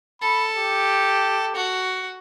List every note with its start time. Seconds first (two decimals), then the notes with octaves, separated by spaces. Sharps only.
0.22 A4 B5
0.57 G4
1.56 F#4